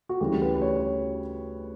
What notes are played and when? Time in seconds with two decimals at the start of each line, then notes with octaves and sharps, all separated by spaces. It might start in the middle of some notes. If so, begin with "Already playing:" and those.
0.09 F#4
0.20 D2 C#3 E3 G3 G4
0.42 B4
0.56 B4
0.62 C#5